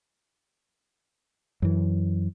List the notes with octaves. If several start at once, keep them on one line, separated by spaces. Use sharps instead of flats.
F#2 E3